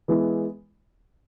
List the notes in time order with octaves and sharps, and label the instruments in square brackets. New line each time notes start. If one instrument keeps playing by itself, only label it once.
[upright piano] E3 G#3 B3 E4